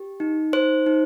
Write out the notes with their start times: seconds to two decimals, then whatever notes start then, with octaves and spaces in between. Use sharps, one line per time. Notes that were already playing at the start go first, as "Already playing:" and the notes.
Already playing: G4
0.20 D#4
0.53 D#4 C5
0.86 D#4